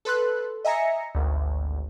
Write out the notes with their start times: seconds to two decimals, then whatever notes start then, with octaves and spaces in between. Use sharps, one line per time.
0.05 A4 B4 C6 F#6
0.65 D#5 E5 G#5 A#5 A#6 C#7
1.15 G#1 D2